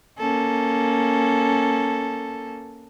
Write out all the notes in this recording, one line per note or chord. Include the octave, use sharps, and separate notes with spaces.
A#3 C#4 A4